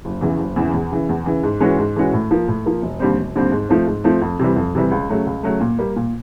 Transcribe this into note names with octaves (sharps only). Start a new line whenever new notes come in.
F#1
E2 C#3 E3
F#1
E2 C#3 E3
E2
C#3 E3
E2
C#3 E3
G#2
E3 G#3 C#4 F#4
G#2
E3 G#3 C#4 F#4
A2
F3 A#3
A2
F3 A#3
E1
D#2 D3 G3 C4
E1
D#2 D3 G3 C4
G#2
F3 A3 C4
G#2
F3 A3 C4
F2
C3 E3 G3
F2
C3 E3 G3
C#2
C#3 F#3 A3
C#2
C#3 F#3 A3
A#2
G3 A#3
A#2